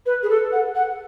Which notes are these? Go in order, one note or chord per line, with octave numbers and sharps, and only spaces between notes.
B4
G#4
A4
F#5
F#5